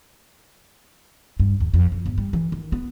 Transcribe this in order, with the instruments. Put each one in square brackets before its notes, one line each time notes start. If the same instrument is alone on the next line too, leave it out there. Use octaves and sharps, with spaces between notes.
[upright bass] G2
D#2
F2
F2
G1
G3
E3
D#3
B3